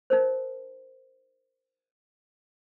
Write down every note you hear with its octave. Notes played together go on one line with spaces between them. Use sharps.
D#4 A#4 C5